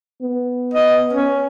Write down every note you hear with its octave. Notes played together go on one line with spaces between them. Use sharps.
B3
D#5
C#4